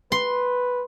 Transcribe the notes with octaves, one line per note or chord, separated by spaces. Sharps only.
B4 C6